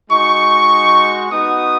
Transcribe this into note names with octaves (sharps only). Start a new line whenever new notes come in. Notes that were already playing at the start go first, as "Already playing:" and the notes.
G#3 D#4 F#4 C#6
B3 D#4 F#4 D#6